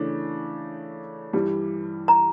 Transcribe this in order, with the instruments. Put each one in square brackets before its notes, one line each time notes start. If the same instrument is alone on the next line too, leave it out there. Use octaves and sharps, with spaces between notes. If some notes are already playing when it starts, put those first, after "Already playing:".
Already playing: [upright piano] C#3 E3 A3 D4
G2 E3 G3
[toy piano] A#5